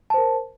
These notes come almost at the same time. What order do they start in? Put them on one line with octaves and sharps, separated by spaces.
A5 C5 A#4